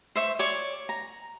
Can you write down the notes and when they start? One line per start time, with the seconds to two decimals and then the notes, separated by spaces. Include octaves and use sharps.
0.16 C5 E5 C#6
0.39 C#5 D5 C#6
0.89 A#5